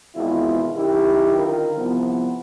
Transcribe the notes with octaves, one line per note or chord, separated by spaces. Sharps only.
G#1 E2 B2 E4 F4
F#2 D#3 E4 G4
D3 D#3 F4 A#4
C2 F3 B3